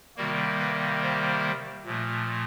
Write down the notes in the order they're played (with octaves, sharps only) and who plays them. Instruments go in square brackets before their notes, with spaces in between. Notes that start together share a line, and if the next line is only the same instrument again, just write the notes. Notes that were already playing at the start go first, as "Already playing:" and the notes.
[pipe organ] C3 D#3 G3 A#3 F#4
B4
C5
A#2 F3 A3